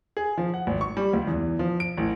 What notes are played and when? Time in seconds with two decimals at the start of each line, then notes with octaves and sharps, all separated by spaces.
0.17 G#4
0.38 F3
0.54 F#5
0.67 G#1
0.81 C#6
0.97 G3
1.13 C#2
1.27 E2
1.59 F3
1.80 D7
1.97 A1